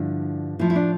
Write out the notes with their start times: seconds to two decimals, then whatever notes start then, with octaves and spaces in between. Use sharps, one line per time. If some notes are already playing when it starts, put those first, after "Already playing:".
Already playing: G2 D3 F3 E4
0.59 A2 F3 E4
0.70 E4
0.76 D4